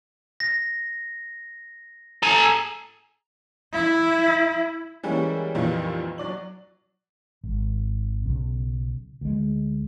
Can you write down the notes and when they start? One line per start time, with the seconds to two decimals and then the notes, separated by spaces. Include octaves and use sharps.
0.40 A#6
2.23 A4 G#5 A#5
3.73 E4
5.03 E3 G3 G#3 A#3 C#4
5.55 F2 A#2 D#3 E3 G3 A#3
6.18 F#3 D5 F#7
7.44 G#1
8.24 B1 C#3
9.21 D2 G#3